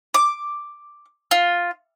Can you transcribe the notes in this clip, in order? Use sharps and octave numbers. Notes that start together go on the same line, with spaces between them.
D6
F4